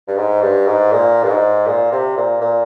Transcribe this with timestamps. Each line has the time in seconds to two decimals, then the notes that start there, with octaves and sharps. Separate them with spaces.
0.08 G2
0.17 G#2
0.42 G2
0.67 G#2
0.92 A#2
1.23 G2
1.29 G#2
1.67 A#2
1.92 C3
2.17 A#2
2.41 A#2